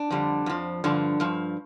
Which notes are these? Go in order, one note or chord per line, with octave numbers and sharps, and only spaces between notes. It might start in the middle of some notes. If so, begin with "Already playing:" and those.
Already playing: D4
F2 D3 G3
F2 F3
G2 D3 F3
G2 F3